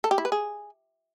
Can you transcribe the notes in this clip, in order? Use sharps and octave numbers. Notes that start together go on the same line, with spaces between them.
A4
G4
E4
B4
G#4